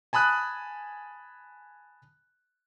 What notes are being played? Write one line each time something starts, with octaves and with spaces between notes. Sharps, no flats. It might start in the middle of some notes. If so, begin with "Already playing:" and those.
G#5 A5 B5 D#6 F#6